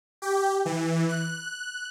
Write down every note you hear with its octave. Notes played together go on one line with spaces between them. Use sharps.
G4
E3
F#6